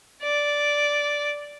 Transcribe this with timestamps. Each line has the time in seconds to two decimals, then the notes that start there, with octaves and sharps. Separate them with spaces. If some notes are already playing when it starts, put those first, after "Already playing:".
0.23 D5